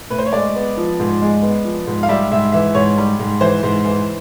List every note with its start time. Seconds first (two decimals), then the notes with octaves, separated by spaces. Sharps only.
0.10 A2 B4
0.18 C5
0.26 C#5
0.33 G#3 D5
0.55 B3
0.77 F3
1.00 G#2
1.22 G#3
1.43 B3
1.65 F3
1.87 G#2
2.03 F5
2.09 G3 E5
2.32 G#2 E5
2.52 E3 E5
2.75 G#2 C#5
2.98 G3
3.19 G#2
3.41 E3 C5
3.63 G#2
3.85 E3